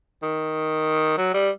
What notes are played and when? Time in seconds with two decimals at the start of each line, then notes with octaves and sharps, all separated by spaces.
0.23 D#3
1.18 F#3
1.34 G3